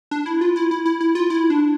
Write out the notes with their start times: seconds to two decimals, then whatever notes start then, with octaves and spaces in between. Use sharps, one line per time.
0.11 D4
0.26 E4
0.41 F4
0.56 E4
0.71 E4
0.86 E4
1.01 E4
1.15 F4
1.30 E4
1.50 D4